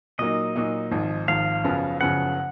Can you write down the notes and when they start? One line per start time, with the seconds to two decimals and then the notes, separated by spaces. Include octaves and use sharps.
0.19 A#2 F#3 A#3 D#4 D#5
0.56 A#2 F#3 A#3 D#4
0.91 G#1 G#2 F3
1.28 G#1 G#2 F3 F5
1.64 F#1 F#2 C#3 F3 B3
2.00 F#1 F#2 C#3 F3 B3 F#5